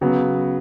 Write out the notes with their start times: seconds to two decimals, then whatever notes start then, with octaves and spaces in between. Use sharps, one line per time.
0.01 C#3 F#3 B3